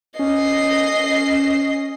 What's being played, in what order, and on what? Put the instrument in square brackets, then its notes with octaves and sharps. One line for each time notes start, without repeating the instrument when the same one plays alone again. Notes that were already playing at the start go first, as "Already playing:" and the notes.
[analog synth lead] C#4 [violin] D#5 C7